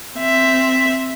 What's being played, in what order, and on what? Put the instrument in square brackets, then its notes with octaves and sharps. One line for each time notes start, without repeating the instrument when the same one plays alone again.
[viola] C4 E5